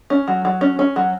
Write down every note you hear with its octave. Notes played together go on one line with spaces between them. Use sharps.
C#4
F#3
F#3
C#4
C#4
F#3